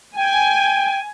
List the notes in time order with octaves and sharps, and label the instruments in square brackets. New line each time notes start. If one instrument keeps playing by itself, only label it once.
[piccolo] G5 [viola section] G#5